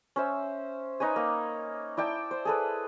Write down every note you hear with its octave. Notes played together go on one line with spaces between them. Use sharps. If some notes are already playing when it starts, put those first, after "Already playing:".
C#4 C5 E5
D#4 B4 C#5 G#5
A#3
E4 D5 G5 A5
C5
G#4 A4 B4